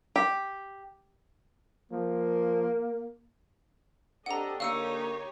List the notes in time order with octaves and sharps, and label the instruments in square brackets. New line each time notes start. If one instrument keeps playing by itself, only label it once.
[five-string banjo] G4
[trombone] F3 [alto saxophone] A#3
[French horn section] C4 G4 [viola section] D4 A4 D#5 [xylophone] F#5 A#5
[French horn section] D3 A#3 [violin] D#4 [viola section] G4 C#5 [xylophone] F5 E6 C#7